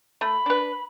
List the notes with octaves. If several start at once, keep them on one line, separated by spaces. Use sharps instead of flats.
A3 B5
D4 B4